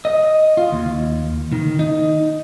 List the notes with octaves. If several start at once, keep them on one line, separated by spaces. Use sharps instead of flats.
D#5
F4
D#2
D#3
D#4